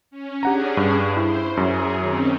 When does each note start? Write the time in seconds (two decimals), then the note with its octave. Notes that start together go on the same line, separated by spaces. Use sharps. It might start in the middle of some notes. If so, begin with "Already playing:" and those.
0.11 C#4
0.43 C#4 D4 G4 G#4 F#5 A#5
0.77 G2
1.17 E4 C5
1.57 F#2 F#3 G#4
1.99 D#3 C4 C#4